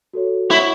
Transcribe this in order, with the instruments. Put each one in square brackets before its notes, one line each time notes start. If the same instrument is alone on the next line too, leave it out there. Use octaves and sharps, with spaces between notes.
[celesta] F#4 A4 C#5
[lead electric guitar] E4 [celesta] C#5 F#5 C#6